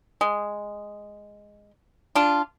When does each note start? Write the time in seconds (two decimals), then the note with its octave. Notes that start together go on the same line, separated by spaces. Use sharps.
0.21 G#3
2.15 D4 F4